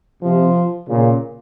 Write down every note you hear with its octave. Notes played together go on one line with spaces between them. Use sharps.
C3 F3
A#2 C#3